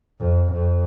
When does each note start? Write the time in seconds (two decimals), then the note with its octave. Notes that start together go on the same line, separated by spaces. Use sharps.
0.20 F2
0.53 F2